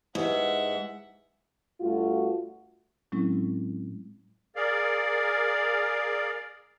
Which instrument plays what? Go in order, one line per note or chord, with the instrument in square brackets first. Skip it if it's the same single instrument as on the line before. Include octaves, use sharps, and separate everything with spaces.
[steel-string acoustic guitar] G#2 [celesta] E4 G4 B4 [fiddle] E5 F#5
[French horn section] G2 A3 F4 F#4
[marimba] A2 F#3 G#3 C4 C#4 E4
[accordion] G#4 A#4 D5 F5